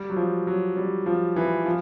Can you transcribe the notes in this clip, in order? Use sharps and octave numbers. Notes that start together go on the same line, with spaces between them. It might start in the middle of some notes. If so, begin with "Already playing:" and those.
Already playing: G3
F#3
F3
F#3
G3
F3
E3
F3